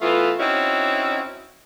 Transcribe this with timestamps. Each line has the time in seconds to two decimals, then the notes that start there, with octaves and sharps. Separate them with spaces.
0.01 E3 A3 B3 F4
0.39 C4 C#4 D#4 E4 F#4